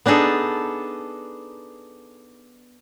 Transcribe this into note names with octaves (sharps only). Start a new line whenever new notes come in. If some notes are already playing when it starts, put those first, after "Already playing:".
B3 D4 D#4 G#4 A4